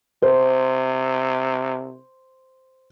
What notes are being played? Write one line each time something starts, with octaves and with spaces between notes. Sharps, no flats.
C3 C5